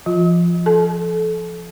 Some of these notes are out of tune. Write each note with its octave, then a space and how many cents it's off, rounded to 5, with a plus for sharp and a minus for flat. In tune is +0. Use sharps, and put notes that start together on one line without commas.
F3 -25 F4 +15
A4 -25 A5 -40